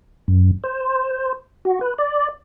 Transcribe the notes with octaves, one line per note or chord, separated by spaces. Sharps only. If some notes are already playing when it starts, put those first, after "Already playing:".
F#2
C5
F#4
B4
D5